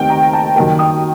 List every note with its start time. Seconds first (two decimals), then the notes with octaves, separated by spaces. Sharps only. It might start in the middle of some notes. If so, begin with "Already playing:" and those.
Already playing: D#2 D#3 A3 C4 G5
0.10 A#5
0.33 A5
0.56 F#2 D#3 G3 A#3 G5
0.79 D#6